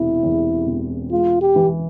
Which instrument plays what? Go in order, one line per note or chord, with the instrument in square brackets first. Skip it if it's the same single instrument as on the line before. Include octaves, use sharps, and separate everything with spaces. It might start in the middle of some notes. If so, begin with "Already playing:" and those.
Already playing: [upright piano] E1 C3 [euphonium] E4
[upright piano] E2
E1
[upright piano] G#3 [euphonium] F4
[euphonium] G4
[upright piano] E3